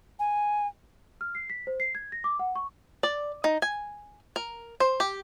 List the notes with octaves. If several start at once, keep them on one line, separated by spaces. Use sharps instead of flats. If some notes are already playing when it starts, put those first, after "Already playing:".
G#5
F6
C7
B6
C5
C7
G#6
A#6
D6
F#5
C#6
D5
D#4
G#5
A#4
C5
G4